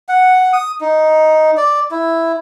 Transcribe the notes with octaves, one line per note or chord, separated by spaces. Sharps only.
F#5
D#6
D#4
D5
E4